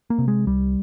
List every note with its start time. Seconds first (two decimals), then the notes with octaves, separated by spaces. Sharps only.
0.10 A#3
0.18 C3
0.28 G#3
0.46 C2 G3